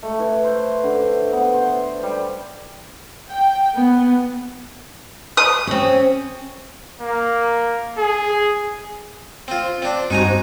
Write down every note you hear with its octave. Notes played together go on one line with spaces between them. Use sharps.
A3
E3
C5
D3
B3
C5
G3
G5
B3
D#6
C4 C#4
A#3
G#4
C4 F4
C4 D4
G2 C4 D#4 F#4 G#5 A#5